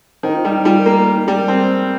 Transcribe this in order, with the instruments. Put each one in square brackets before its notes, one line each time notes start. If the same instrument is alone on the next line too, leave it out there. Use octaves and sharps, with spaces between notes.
[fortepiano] D#3 [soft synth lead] C5
[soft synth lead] D#4
F4
[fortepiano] G3 [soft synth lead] D#4
[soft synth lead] D#4
[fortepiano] G3 [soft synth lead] F4
[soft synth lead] A#4
[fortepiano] A#3
[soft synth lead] A#4
A#4
D#4
[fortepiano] G3 [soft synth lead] G4
[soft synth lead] A#4
[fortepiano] C4 [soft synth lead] A#4